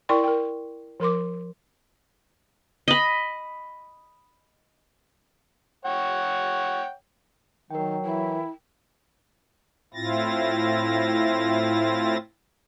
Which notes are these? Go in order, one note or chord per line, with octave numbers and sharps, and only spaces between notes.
E4 A#4 D5 G5 C6 C#6
A#4 G5
F3 A#4 C6 D6
D#5 B5
C#5 F#5 G5
D#3 F#3 A#4 G5
E3 E4
A2 C4 E4 F4 A6 A#6